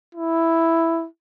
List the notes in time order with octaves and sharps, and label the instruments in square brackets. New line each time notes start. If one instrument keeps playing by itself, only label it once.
[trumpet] E4